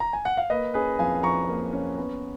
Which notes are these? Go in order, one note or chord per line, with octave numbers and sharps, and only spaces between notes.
A#5
G#5
F#5
F5
A#3 B4 D#5
C#4 G#4 B4
F2 F5 G#5
F3 A#5 C#6
A#3
C#4
B3